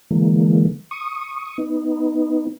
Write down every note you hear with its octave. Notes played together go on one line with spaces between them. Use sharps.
D3 E3 G#3 A#3
C#6 D#6
B3 D#4